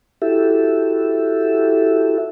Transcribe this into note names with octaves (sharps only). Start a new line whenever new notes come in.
E4 F#4 G4 A4 E5